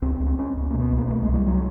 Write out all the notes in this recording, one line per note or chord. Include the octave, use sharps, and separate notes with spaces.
C#2 C4
C4
C#2
C4
C#2 C#4
C#2
B3
A#3
B2
B3
C2
A#3
C2 A3
G#3
C2
G3
F#3